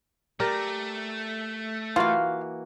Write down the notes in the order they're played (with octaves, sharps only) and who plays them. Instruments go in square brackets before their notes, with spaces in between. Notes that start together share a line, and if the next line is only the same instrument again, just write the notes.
[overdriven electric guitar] A3 [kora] G4 A#4 D5
[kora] E3 A#3 F#4 [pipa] F4 F5